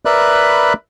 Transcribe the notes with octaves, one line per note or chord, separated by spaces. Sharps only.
A#4 B4 D5 E5 B5 F#6